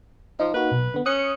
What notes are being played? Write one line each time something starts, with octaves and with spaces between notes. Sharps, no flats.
F3 D#4
A#3 D#4 F#4 B4
B1
D3 B3
C#4 D#6 F#6 C#7